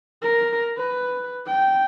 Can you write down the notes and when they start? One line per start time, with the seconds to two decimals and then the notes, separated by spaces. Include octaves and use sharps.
0.22 A#4
0.78 B4
1.46 G5